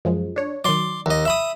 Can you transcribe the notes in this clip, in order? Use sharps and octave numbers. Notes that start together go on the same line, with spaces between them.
F#2 F3 G#3
D4 C#5
D#3 F#3 D5 C6
D#2 D#5
E5 B5 D#6